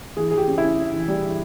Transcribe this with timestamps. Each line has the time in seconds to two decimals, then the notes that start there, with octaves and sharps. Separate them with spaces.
0.17 E3 G#4
0.31 E3 G#4
0.38 G4
0.47 C#4
0.58 C#4 E4
0.78 C#4
0.93 E3
1.08 G3
1.22 E3